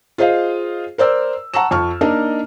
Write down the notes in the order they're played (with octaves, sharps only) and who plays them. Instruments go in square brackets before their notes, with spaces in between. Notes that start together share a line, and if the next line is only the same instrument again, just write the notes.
[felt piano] F4 G#4 C5 D#5 F5
A#4 C5 D5 E6
F#5 A5 A#5 C#6 E6 E7
F2 A5 C#6 F6
A#3 D4 D#4 A#4 D#5 A5